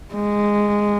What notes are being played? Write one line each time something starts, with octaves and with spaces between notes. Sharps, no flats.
G#3